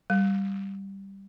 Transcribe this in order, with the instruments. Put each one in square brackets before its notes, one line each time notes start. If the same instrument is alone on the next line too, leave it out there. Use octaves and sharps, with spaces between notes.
[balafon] G3